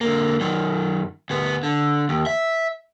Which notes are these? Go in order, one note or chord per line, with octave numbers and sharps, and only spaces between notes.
D3 A#3
F#2 D#3
D2 B3
D3
D#2
E5